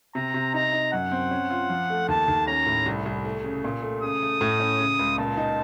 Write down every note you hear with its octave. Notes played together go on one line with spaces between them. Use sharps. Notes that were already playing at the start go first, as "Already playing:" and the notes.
C3 A#5
C3
D#4 A#5
D#4
F#2 F#5
C4
C#4
F4
F3
A3
D#2 A5
D#2
C#4 A#5
A2
C2
C2
A3
C#3
A#2
A3
C#3 D#6
A3
A2
C#4
C#3
C#2
A#2 A5
D#4